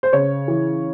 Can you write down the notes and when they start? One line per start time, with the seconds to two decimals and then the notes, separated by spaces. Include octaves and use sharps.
0.03 C5
0.13 C#3 C#5
0.48 E3